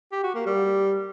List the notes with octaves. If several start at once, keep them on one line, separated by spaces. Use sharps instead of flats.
G4
F#4
A#3
G3